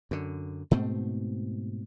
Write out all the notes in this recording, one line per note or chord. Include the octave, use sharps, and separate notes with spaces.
F#2 D3
G#2 B2 A3 C4